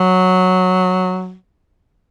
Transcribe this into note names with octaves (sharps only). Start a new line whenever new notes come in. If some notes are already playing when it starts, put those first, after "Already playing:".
Already playing: F#3